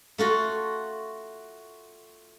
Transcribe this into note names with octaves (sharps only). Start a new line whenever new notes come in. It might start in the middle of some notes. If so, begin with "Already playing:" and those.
A3 F4 F#4